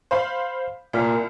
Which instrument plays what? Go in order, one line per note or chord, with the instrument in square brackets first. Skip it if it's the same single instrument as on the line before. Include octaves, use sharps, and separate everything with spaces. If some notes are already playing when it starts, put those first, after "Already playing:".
[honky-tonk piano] C5 F5 B5
[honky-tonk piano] C2 F6 B6 [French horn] A#2